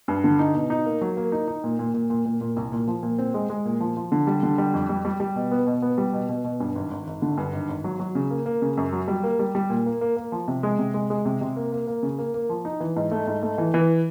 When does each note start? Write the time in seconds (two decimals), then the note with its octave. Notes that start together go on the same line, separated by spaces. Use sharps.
0.08 G2
0.24 D3
0.39 D#4
0.55 B2
0.70 D#4
0.86 A#3
1.01 F#3
1.17 A#3
1.32 D#4
1.48 D#4
1.64 A#2
1.79 A#2
1.94 A#2
2.10 A#2
2.25 A#2
2.41 A#2
2.56 C2
2.72 A#2
2.87 F3
3.03 A#2
3.18 C4
3.34 G#3
3.50 G#3
3.65 A#2
3.80 F3
3.97 F3
4.12 D3
4.27 G3
4.43 D3
4.58 G3
4.74 F2
4.89 G3
5.05 G3
5.20 G3
5.36 B2
5.51 B3
5.67 B2
5.82 B3
5.98 G3
6.13 B2
6.29 B2
6.44 B2
6.60 G2
6.75 G#1
6.91 G#1
7.07 G#1
7.22 D3
7.37 G2
7.53 G#1
7.69 G#1
7.84 F#3
8.00 F#3
8.15 C#3
8.31 A#3
8.46 A#3
8.62 C#3
8.77 F#2
8.93 F#3
9.08 G3
9.23 A#3
9.39 G3
9.55 G3
9.70 A#2
9.86 A#3
10.01 A#3
10.17 A#3
10.32 F3
10.48 C3
10.63 G#3
10.79 C3
10.94 G#3
11.10 G#3
11.25 C3
11.41 C3
11.56 A#3
11.72 A#3
11.87 A#3
12.03 C#3
12.18 A#3
12.34 A#3
12.49 F3
12.65 D#4
12.80 E3
12.96 G#2
13.11 A3
13.27 G#2
13.43 A3
13.58 E3
13.74 E3